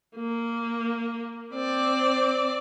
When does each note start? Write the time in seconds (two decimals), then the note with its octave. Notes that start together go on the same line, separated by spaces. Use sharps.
0.16 A#3
1.54 C4 D5